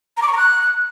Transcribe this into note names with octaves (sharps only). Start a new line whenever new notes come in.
A#5
D6
C#6
A#5
F#6